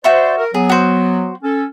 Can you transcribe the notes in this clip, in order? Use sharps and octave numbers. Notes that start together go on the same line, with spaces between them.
F#4 C5 D5 E5 C#6
A#4
F#3 B3 G#4
F#4 C5
C#4 A4